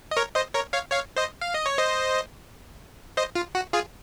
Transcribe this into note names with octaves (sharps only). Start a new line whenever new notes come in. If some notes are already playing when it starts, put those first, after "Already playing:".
D#5
A#4 C#5
C5 D#5
A#4 C#5
C#5 F5
C#5 F5
C5 D#5
F5
D#5
C#5
C5 D#5
C5 D#5
F4
F#4
F4 G#4